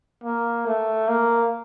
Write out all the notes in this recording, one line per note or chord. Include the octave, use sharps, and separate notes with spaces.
A#3
A3
A#3